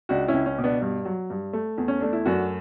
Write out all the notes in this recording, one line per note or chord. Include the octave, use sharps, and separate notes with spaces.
C#2 D4 F#4
C#4 E4
C#2
C#4
B2
B3 D4
G2
F#3
G2
A3
E2
C#4
A3 D4
E4
F#2 D4 F#4